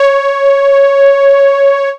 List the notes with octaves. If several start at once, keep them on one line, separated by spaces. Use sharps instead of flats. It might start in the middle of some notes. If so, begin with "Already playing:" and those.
Already playing: C#5